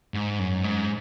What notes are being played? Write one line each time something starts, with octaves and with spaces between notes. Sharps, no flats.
G#2
F#2
G#2